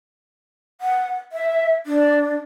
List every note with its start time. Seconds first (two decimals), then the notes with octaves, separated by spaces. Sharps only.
0.81 F#5
1.32 E5
1.86 D4